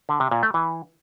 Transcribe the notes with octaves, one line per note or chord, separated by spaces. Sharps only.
D3
C3
A#2
A3
E3